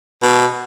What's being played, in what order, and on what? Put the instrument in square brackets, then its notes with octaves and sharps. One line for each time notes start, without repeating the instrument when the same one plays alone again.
[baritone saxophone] B2